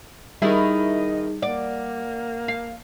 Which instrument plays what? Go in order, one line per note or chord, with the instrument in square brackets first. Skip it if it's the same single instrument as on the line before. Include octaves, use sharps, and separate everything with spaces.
[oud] D#3 E4 [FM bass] G3 [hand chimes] D#4 G#4 [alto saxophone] D#5
[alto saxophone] A#3 [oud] D5 [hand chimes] F#5
[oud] F5